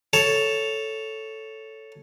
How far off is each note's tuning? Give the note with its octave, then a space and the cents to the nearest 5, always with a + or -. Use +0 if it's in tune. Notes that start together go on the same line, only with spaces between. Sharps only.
A4 +0 C#5 +10